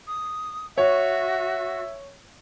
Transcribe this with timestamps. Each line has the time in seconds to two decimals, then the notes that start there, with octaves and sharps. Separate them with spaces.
0.07 D#6
0.78 F#4 C#5 E5